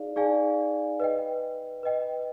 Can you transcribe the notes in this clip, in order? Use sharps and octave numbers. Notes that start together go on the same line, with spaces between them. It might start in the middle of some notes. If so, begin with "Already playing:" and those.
Already playing: D#4 G#4 D5 F5
D#4 G#4 D5 F5 G#5
B4 D#5 G5
B4 D#5 G5